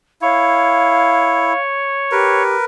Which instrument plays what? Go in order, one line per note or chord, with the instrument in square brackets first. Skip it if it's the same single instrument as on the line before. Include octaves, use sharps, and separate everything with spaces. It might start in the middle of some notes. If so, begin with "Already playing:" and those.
[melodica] E4 [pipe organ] C#5 [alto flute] F5
[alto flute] G4 [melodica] A#4 B4